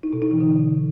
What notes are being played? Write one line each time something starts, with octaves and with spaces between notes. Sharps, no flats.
D#4
B2
D#4
E3
D3